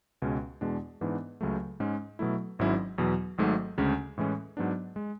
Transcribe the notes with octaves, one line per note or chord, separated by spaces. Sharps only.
C#2 B2 G#3 C#4
E2 B2 G#3 D4
G#2 E3 B3 D4
C#2 C#3 F#3 A3
G#2 G#3 C#4
B2 F#3 A3 E4
G#1 G#2 F#3 C#4 E4
E2 B2 F#3
G#1 G#2 F#3 A3
D2 C#3 G#3 C#4
A2 E3 G#3 C#4
G#2 F#3 B3 D4
G#3